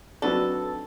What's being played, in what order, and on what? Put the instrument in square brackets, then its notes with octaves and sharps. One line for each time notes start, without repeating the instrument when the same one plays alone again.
[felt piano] F#3 C4 D#4 [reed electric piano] D4 F#4 B4 [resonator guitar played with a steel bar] A4